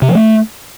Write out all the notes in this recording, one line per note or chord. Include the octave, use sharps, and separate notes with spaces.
C3
F3
A3